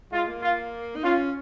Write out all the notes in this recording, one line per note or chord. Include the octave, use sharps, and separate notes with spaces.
G#3 F4
A#3
F4
D#4
C#4 F4